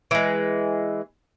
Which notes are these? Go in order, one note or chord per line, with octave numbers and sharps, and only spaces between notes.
E3 G#3